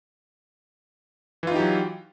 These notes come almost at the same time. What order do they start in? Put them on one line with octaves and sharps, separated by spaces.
E3 F4 D#4 G4 F#3